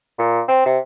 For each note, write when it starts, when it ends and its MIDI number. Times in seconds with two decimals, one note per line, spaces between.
0.19 0.42 46
0.48 0.65 60
0.66 0.78 48